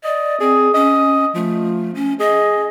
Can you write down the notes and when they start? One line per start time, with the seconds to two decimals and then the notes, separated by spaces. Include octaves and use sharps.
0.04 D5 D#5
0.40 C4 G#4
0.74 C#4 D#5
1.35 F3 A3
1.95 C#4
2.20 G#4 D#5